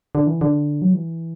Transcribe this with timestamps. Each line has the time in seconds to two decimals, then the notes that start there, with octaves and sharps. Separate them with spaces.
0.15 D3
0.27 E3
0.41 D3
0.82 F#3
0.94 E3